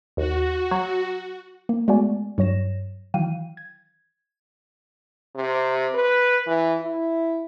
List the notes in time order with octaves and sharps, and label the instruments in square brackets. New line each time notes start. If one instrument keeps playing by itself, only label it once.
[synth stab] D#2 [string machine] F#4
[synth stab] F#3
[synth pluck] A#3
G#3 A3 B3 F#4 D5 G#5
G2 F#3 C#5 A#6 E7
D#3 E3 F#3 F5 G5 D#7
G#6
[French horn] C3
B4
E3
E4